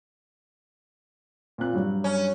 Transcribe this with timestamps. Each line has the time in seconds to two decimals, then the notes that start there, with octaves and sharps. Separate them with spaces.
1.58 A#2 C4 F#6
1.73 G2 F#3 G3
2.04 C#4